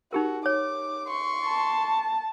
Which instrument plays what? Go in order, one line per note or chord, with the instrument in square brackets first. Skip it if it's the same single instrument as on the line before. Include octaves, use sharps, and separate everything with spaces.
[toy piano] D#4 G4 A#4 [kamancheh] F#4
[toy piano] C#5 [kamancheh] D6
[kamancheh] C6 C#6
[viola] A5